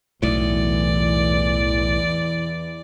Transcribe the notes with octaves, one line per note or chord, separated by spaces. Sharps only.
B1 E2 A2 E3 D5